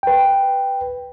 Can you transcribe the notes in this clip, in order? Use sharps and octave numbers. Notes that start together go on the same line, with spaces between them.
B4 G5